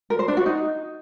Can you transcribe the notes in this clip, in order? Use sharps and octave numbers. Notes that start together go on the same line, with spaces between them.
A#4
C5
D4
F#4
D#4